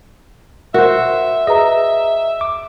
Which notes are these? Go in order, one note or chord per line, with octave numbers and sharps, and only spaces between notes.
F#4 A#4 C5 E5
G#4 B4 D#5 A#5
D6